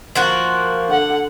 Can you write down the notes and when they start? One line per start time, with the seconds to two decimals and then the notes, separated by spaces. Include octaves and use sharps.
0.16 F3 A#3 F#4
0.89 D3 F#5